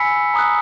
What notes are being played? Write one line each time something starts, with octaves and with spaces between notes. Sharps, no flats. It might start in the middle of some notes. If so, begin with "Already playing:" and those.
Already playing: G#5 B5 E6 B6 C#7
A#5 D#6 F#6